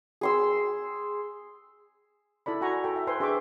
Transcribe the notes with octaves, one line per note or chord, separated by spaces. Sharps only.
G#4 C6 E6
E4 A4 D5 B5
F#4 F#5 G#5 A#5 C#6
A4 G5
E5
B4 C5 G#5 C6
D4 G#4 E5 G5 C#6 D6